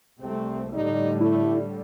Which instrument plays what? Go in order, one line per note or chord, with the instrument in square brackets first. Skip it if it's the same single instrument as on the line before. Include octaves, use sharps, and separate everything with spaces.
[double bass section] C2 A3 C4 [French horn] C3
[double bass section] A2 D3 G3 [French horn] D#4
[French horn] A3 [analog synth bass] E4